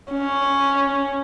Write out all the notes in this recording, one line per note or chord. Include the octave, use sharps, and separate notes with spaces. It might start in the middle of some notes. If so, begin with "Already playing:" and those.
C#4